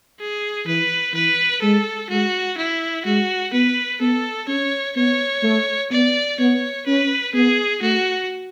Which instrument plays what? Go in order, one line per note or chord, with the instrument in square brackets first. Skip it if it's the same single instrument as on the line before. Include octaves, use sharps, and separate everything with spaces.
[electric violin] G#4
[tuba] E3 [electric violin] B4
[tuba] E3 [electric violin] B4
[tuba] G#3 [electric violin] A4
[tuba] G#3 [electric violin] F#4
[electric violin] E4
[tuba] G#3 [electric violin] F#4
[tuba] B3 [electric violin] B4
[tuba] B3 [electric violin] A4
[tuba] C#4 [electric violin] C#5
[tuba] B3 [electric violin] C#5
[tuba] A3
[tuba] B3 [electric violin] D5
[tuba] B3 [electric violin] C#5
[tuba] C#4 [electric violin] B4
[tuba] B3 [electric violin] G#4
[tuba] A3 [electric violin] F#4